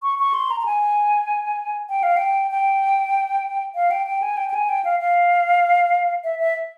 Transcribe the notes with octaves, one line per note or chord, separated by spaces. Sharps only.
C#6
C#6
C6
A#5
A#5
G#5
G5
F5
G5
G5
F5
G5
G5
G#5
G5
G5
G#5
G5
F5
F5
E5
E5